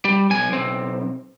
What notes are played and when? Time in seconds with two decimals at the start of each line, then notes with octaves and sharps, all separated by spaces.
0.05 G3
0.30 B1 G#5
0.49 B1 C4